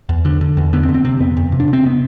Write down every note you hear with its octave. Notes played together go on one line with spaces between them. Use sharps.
E2
D3
D3
E2
D3 B3
C4
D3
C4
C3 C4
F2 B3
F2
C3
D4
C3
C4
C3 B3